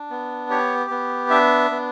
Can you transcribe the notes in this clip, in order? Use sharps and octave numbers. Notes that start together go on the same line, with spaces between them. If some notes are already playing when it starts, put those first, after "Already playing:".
Already playing: D4
B3
G4 C#5
B3
D4 E5
B3